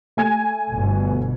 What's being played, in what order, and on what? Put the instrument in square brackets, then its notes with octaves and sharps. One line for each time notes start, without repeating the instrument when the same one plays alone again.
[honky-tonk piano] A3 G#5 G#6
[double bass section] G1 B2